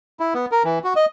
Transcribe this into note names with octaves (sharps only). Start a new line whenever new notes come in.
E4
B3
A#4
E3
F#4
D#5